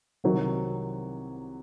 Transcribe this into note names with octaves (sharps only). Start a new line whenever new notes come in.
C2 C3 D#3 F#3